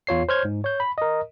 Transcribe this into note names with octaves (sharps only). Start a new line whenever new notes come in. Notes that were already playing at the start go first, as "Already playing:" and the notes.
E2 F4 C#5 C7
C5 C#5 F6 G6 G#6
G#2
C#5 G6
B5
A#4 D#5